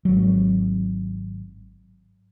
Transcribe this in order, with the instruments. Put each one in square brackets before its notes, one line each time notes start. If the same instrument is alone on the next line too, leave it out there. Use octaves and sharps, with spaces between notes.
[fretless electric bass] G#1 F#3